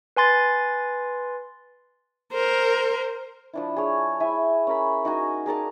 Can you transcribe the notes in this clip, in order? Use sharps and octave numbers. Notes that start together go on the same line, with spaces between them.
B4 G#5 C6 A6
A#4 C5
F3 D4 E4
G#4 C#5
E4 E5 G#5
C#4 A#4 B5
D#4 F#4 G#5
G#4 A#4 D5 A5